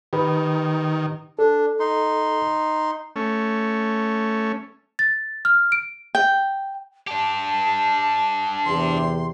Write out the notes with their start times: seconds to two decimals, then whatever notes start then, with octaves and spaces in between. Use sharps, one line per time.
0.13 D#3 G4 B4
1.39 D4 A4
1.80 D#4 C6
3.16 A3 C#4
4.99 A6
5.45 F6
5.72 D7
6.15 G5
7.07 D4 G4 A5
8.66 E2 C3 C6